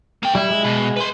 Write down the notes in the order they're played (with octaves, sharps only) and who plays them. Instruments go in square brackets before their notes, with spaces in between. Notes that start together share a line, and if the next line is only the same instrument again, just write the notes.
[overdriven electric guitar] A#3 G5
[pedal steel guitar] G3 [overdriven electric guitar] E4
[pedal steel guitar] G#3
[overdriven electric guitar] B2
B4 C6